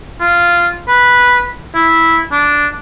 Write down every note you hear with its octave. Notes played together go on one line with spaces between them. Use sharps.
F4
B4
E4
D4